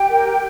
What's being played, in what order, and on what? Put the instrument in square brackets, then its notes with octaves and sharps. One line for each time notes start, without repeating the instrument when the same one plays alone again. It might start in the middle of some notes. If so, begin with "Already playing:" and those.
Already playing: [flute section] G4 G5
A#4